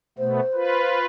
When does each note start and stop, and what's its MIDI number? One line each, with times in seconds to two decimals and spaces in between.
0.18 0.40 47
0.18 0.40 57
0.18 0.40 59
0.18 0.99 72
0.54 1.06 65
0.54 1.06 71